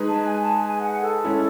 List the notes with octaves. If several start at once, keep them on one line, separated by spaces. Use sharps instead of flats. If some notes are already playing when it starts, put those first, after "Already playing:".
Already playing: G#3 D#4 G#4 B4
A5
G#5
A5
G#5
F#5
A4
G#3 C#4 E4